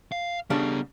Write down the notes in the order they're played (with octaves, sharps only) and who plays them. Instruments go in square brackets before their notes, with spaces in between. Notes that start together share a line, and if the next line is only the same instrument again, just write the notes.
[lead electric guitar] F5
[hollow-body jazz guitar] C#3 G3 D4 [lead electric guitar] B3 A4